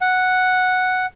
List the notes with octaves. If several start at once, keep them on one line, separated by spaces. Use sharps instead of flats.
F#5